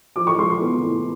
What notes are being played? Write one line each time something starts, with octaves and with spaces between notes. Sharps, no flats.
F3 D6
C#6
G#3 C6
C6
B3
A2